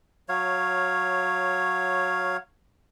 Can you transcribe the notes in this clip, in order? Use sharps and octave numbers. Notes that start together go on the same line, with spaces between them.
F#3 C#5 F5